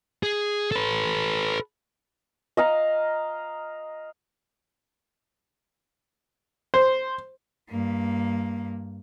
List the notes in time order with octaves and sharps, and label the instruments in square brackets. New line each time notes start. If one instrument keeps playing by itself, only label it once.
[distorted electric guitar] G#4
A4 B4
[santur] D#5 F5 A#5
[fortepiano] C5
[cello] G2 A#3